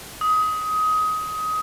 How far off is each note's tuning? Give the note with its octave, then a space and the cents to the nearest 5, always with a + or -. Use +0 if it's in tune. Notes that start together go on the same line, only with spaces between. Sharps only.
D#6 +20